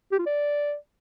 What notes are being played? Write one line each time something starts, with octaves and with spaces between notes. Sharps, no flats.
G4
F4
D5